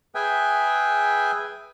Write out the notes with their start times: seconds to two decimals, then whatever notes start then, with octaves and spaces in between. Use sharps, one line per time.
0.15 G#4 B4 E5 G5 G#5